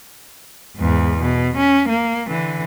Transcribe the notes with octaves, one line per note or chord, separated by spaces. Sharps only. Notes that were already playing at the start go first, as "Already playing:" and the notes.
E2 G#2
B2
C#4
A#3
D3 E3